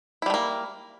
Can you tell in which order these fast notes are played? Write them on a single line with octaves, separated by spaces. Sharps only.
E4 G3 A3 A#3